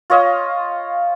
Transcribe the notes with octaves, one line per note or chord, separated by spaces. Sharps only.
F4 C#5 D#5 F5